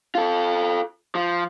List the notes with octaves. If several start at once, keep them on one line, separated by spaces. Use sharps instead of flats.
F4 A4
F3